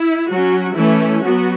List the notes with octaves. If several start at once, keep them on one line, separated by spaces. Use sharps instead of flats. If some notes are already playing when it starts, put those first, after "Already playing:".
Already playing: E4
F#3 C#4 F#4
E3 A3 C#4 E4
F#3 B3 F#4